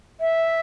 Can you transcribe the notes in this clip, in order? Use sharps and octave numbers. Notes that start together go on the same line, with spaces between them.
E5